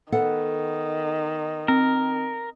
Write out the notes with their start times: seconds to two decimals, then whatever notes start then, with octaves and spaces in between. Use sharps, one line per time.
0.12 D#3 B3 A4 F#5
1.68 C4 A#4